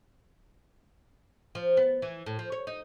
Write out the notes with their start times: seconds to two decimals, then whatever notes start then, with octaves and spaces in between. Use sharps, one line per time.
1.55 F3
1.77 B3
2.02 E3
2.26 A2
2.39 F3
2.52 C#5
2.67 D#4